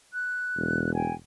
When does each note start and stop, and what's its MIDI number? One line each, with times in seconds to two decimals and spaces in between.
0.13 0.94 90
0.56 1.14 28
0.94 1.14 79
0.94 1.14 80